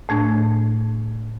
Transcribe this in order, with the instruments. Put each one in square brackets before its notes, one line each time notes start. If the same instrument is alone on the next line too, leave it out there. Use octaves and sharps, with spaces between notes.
[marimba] A2 A3 D4